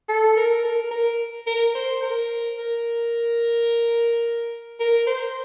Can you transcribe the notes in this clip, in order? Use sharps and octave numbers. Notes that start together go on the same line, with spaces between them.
A4
A#4
A#4
A#4
A#4
C5
A#4
A#4
A#4
C5